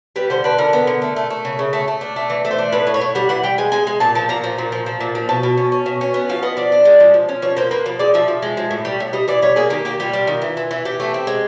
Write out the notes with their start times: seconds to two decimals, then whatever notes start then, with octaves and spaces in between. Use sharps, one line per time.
0.16 G3 B4
0.30 D3 C5
0.44 D4 B4
0.58 D3 A#4
0.73 B3
0.87 D3
1.02 A3
1.16 A3
1.30 A3
1.45 C#3
1.59 C#3
1.73 A3
1.88 A3
2.01 D4
2.16 A3
2.30 E3
2.45 A3
2.51 C5
2.59 D4
2.72 A2 B4
2.87 A2
2.94 C#5
3.01 A2
3.15 G3 F#5
3.29 E3 F#5
3.44 G3 G5
3.58 G#3 G#5
3.72 G#3 G#5
3.87 G#3 G#5
4.00 A#2 A5
4.15 F3 A5
4.29 A#2 A#5
4.44 F3
4.58 A#2
4.72 F3
4.86 F3
5.00 A#2
5.15 F3
5.29 B2 A5
5.43 B2
5.57 C#4
5.72 C#4
5.86 B2
6.01 C#4
6.14 B3
6.29 F3 F5
6.43 B3 D#5
6.57 F3 D5
6.72 D4
6.85 G#3
7.00 F3
7.14 F3
7.29 C#4
7.42 F3 C#5
7.57 A#3 C5
7.71 A#3 B4
7.86 F3
7.99 G#3 D5
8.14 F3 E5
8.28 F3
8.42 G#3
8.57 F3
8.71 A2
8.85 G3
9.00 A2
9.13 G3 D#5
9.28 E3 D5
9.42 G3 C#5
9.56 A#3 G#4
9.70 D#3 G4
9.85 A#3 G4
10.00 G3 F4
10.13 G3
10.27 D#3
10.42 E3
10.57 E3
10.71 E3
10.85 E3 G4
11.00 A3
11.14 C4
11.27 G#3